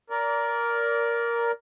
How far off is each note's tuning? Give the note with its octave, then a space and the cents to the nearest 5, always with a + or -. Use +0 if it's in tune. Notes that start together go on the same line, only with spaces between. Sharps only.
A#4 +5 D5 -25